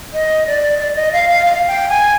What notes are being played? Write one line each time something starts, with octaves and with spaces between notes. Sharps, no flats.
D#5
D5
D5
D#5
F5
F5
F5
G5
G#5